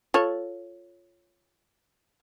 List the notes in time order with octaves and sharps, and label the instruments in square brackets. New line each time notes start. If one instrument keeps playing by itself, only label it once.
[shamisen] F4 A4 C#5